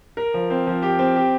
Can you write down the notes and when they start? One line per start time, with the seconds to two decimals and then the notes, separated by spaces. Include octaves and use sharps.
0.17 A#4
0.34 F3
0.50 C4
0.67 F3
0.82 G4
0.99 C4
1.16 G4